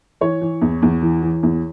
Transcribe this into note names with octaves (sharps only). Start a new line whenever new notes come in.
E3 C#5
E3
E2
E2
E3
E3
E2